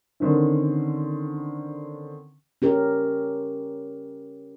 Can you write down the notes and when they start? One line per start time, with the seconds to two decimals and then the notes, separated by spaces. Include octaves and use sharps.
0.20 D3 D#3 C4 C#4
2.62 C#4 G4 A#4